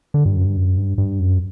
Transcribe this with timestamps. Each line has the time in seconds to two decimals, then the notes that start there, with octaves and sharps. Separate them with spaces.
0.14 D3
0.25 G2
0.36 F#2
0.45 G2
0.57 F#2
0.77 G2
0.98 G2
1.20 F#2